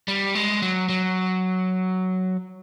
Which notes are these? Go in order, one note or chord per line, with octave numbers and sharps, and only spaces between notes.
G3
G#3
F#3
F#3